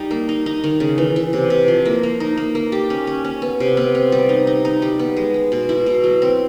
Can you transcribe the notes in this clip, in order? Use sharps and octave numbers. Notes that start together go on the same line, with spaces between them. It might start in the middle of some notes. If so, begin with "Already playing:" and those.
Already playing: G3 D#4
A#3
D#4
D#4
D#3
C#3
E3
E3
C3
C3
F3
A#3
A#3
D#4
A#3
A#3
G4
C#4
C#4
C#4
B3
C3
B3
C4
G3
D#4
D#4
D#4
G3
B3
G#3
G#3
B2
E4
B2
F#3
C4